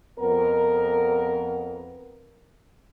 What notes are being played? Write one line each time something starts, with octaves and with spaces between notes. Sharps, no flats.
F2 B3 A#4